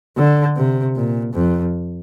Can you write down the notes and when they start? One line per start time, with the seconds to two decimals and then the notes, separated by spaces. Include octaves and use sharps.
0.17 D3
0.56 C3
0.96 A#2
1.34 F2